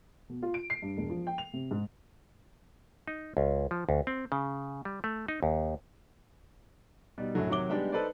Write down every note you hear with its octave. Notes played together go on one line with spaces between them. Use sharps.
B2
F4
D7
C7
G2
E1
F3
G5
F7
C3
G#2
D#4
C#2
F3
D2
C4
C#3
G3
A3
D#4
D#2
B2 G3 D#4
F#2 A2 D3 F#3 A3
C3 D#3 F#3 C#5 D6 G7
G3 G#3 B3 D4 D#4 G4
D#4 A4 B4 C5 D5